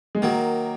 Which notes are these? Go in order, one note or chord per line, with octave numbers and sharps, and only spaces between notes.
G#3
D#3 F#3 A#3